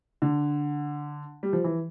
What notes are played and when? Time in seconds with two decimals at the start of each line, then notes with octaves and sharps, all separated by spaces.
0.22 D3
1.43 G3
1.53 F3
1.64 E3